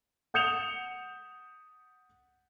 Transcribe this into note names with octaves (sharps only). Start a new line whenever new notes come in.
F#5 D#6 G6 C#7 E7 F7